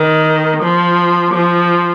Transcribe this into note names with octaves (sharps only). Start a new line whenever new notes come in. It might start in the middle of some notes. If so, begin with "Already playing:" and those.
Already playing: D#3
F3
F3